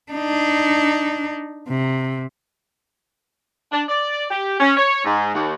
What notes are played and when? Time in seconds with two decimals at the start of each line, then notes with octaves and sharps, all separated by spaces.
0.12 D4 D#4
1.69 C3
3.72 D4
3.88 D5
4.31 G4
4.60 C#4
4.77 C#5
5.05 G#2
5.34 D#2